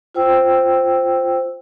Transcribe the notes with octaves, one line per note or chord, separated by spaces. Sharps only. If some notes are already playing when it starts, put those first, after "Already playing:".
F4 C5 G5 E6